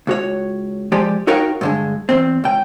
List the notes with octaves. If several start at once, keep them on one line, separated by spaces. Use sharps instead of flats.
C#2 F#4 C#5
F3 G#3 G4 D5
D#4 F#4 A#4 C#5 F5 G5
G2 D3 G#3
E2 C4
C#2 G5